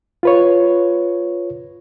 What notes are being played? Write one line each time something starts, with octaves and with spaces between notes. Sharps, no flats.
F4 B4 C#5